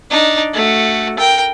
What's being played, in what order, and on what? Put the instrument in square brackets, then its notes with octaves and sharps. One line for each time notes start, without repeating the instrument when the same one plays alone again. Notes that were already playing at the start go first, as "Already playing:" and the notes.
[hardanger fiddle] D4 D#4
A3 F#4
A#4 G5